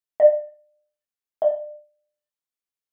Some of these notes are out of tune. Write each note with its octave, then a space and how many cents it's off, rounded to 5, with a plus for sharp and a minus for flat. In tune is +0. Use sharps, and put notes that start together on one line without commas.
D5 +35
D5 +30